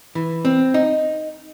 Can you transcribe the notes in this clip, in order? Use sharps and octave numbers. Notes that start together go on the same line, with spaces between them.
E3
C4
D#4